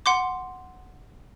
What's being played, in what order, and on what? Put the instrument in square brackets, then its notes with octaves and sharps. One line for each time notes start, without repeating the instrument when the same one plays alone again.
[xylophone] F#5 C6 D6